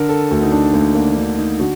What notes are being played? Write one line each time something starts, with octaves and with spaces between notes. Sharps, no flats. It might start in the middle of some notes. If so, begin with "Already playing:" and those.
Already playing: D3 A#4
A4
D2 F#4
D#4
D4
D2 A#3
A#3
D3
D#4
D3 F#4